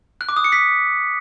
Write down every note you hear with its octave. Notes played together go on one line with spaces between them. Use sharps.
F#6
D6
D#6
C#7
B6